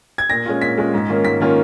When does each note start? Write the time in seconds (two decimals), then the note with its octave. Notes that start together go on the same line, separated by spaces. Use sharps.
0.18 G#6
0.30 A#2 A#6
0.46 G#3 C#4 F4
0.61 A#2 B6
0.78 G#3 C#4 F4
0.94 G#2
1.09 D#3 A#3 C#4 F4
1.25 G#2 B6
1.40 D#3 A#3 C#4 F4